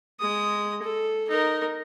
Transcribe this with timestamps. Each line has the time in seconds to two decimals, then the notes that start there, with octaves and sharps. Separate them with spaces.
0.20 G#3 D#6
0.82 A4
1.30 D#4 A#4